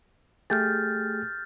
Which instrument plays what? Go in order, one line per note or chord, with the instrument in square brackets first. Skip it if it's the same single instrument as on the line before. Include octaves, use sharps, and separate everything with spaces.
[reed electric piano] A3 G4 G#4 [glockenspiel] F6 G6 A6